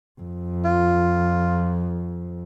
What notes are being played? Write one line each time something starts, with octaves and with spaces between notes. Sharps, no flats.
F2
F4